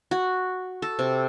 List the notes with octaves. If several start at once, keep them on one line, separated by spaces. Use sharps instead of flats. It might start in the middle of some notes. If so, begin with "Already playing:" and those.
F#4
A4
C3